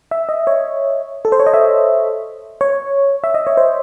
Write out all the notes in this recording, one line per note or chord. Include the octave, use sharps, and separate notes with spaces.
E5
D#5
C#5
A4
C5
C#5
D#5
E5
C#5
E5
D#5
C#5
C5